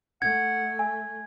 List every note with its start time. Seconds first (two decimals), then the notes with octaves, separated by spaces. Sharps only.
0.22 A3 F#5 G#6
0.79 E5 G#5